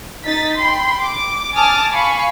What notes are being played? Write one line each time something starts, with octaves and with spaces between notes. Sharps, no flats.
D#4 A6 B6
G5 B5 C6
D6
G#5 A5 D6 D#6 F6 A6
F5 G#5 B5 C#6